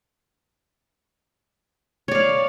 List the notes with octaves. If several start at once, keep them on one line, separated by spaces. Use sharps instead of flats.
C#5 D5 F5